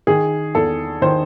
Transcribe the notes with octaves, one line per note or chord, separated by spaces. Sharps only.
D#3 G#4
E2 A4
D#3 C5